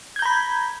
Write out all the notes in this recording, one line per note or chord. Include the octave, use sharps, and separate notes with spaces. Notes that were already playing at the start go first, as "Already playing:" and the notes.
A#5 B5 G6 G#6